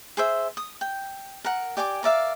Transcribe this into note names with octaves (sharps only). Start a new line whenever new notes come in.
G#4 C5 E5
D#6
G5
A#4 F#5
G4 D5 G#5 D6
A#4 D5 E5 F5